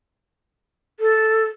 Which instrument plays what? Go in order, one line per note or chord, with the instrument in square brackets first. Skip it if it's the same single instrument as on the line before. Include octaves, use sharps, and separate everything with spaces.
[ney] A4